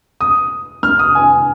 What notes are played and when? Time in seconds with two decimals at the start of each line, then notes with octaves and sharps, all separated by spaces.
0.21 D#6
0.83 F6
0.99 D#6
1.15 G#5